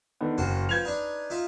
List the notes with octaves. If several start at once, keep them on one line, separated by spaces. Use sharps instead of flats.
D3 D#3 B3
F#1 F#4 C5
F3 B3 G6 G#6 F7
D4 D#4 B4
D#4 F4 E5